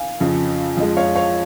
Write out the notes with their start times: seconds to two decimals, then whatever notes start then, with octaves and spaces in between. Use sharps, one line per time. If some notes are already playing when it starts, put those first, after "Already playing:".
Already playing: F5 G#5
0.20 F2 C#3 F3
0.77 F2 F3 G#3 D#5
0.97 C#5 F5
1.15 C#5 F5